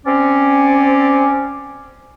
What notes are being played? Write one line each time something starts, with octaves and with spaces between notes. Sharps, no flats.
C4 C#4 D5